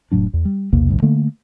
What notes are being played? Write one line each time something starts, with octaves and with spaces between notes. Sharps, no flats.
F1 A2 F#3 D4
E2
G3
B1 E2 C3 A#3
A1 D2 G2
D3 A3 A#3